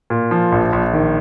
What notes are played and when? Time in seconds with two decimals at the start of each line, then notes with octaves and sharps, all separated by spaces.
0.10 A#2
0.31 F3
0.52 A#1
0.73 A#1
0.93 D#3